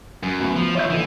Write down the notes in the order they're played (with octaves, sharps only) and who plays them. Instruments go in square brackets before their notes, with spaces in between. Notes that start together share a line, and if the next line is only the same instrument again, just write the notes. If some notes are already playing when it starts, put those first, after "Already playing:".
[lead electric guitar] F#2
[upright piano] D2 B3
[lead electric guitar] F3
[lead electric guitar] D#3 F4 [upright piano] C#5 E5 G6
[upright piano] A#1 D3 D#7 [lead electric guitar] E3